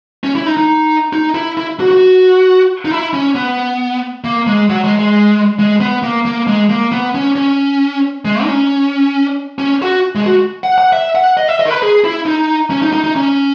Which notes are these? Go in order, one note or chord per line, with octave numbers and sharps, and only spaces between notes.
C#4
E4
D#4
D#4
D#4
E4
E4
F#4
F#4
D#4
E4
C#4
B3
A#3
G#3
F#3
G#3
G#3
G#3
B3
A#3
A#3
G#3
A#3
B3
C#4
C#4
G#3
D#4
C#4
C#4
F#4
G#3
F#4
F#5
F#5
E5
F#5
D#5
E5
D#5
A#4
B4
G#4
E4
D#4
C#4
D#4
D#4
D#4
C#4